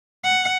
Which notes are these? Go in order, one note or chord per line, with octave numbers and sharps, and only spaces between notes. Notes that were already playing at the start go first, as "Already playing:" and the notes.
F#5